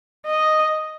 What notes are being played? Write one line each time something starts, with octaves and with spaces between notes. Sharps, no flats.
D#5